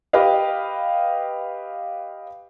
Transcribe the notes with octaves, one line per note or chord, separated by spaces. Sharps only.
G4 B4 D#5 F5